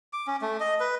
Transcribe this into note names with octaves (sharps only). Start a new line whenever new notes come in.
D6
C#4
A3
D#5
B4